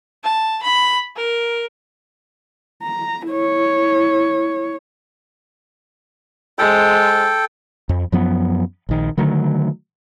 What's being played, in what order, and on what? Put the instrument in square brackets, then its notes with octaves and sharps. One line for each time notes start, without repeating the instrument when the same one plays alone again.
[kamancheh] A5
B5
A#4
[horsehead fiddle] A#5
E4 C#5
[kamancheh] G#3 C5 [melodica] A4 G5
[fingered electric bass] F2
F#2 F3 F#3 B3
A#1 D#3
D3 D#3 F#3 A3